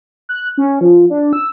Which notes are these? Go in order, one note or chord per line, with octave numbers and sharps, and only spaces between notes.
F#6
C#4
F3
D4
E6